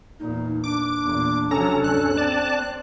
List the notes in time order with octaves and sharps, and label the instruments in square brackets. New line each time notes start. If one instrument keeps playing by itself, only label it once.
[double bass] E2 A#2 [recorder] D#4
[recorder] D4 [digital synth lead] D6
[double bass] E2 A#2
[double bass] C3 F#3 [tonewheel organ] C#4 A4 [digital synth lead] A#5
[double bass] D2 G2 [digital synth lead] F#6
[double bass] C4 [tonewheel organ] D5 A5